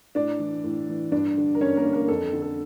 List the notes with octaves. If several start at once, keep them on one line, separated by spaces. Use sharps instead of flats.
A2 D4 D5
E3
A2
E3
G2 D4 D5
D3
A#4
G2 C#4 C#5
A#3 A#4
D3
A#3 A#4
F2 A4
A4
D3
A4